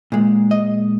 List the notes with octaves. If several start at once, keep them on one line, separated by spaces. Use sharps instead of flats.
A#2 G#3
D#5